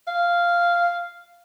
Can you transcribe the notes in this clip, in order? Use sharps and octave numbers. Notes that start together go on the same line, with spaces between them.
F5